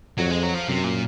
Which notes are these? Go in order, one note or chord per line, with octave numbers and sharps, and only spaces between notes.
F2 F#3
G#3
F#3
F3
F#2 C3
A#2